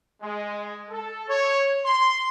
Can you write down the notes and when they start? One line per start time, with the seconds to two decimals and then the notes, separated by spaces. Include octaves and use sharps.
0.22 G#3
0.90 A4
1.28 C#5
1.85 C6